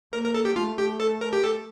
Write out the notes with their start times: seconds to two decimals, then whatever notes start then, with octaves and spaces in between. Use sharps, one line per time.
0.13 A#3 A#4
0.24 A#4
0.34 A4
0.45 G4
0.56 A3 F4
0.78 G4
1.00 A4
1.21 A#4
1.33 G4
1.44 A4